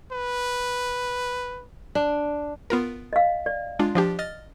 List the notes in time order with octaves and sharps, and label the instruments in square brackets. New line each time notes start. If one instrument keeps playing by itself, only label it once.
[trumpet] B4
[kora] D4
[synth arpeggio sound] B3 F4 A#4
[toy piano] D#5 F5
D5
[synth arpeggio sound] G#3 D4 F4
F3 D4 G4
D#5 F6 A6